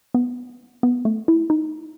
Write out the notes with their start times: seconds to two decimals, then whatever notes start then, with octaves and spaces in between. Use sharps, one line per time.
0.14 B3
0.83 B3
1.05 A3
1.28 E4
1.50 D#4